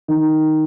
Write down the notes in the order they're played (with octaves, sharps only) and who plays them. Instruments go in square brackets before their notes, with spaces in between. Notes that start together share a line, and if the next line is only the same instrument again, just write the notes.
[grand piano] D#3